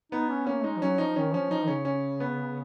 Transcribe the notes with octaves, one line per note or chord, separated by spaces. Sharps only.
B3 D#4
C#4
A#3 C#4
G#3 D#4
F3
F#3 C#4
F3 D#4
D#3 C#4
F3 C#4
F3 D#4
C#3 C#4
C#4
B3